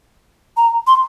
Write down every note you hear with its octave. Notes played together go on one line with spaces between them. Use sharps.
A#5
C6